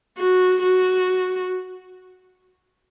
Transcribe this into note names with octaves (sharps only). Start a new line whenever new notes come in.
F#4
F#4